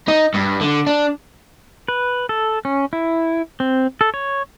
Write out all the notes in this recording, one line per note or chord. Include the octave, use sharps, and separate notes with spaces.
D#4
G2
D3
D4
B4
A4
C#4
E4
C4
A4
C#5